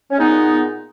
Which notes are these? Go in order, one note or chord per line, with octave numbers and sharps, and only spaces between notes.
C#4
A#2 G#3 B3 D#4